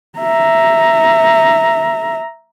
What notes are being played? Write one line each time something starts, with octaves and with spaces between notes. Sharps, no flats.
E5 A#5